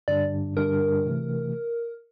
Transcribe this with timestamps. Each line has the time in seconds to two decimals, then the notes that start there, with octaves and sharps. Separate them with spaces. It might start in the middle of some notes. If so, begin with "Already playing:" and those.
0.08 G2 D3 G3 D4 D5
0.57 G2 D3 G3 D4 A#4
1.06 C3 E3 A3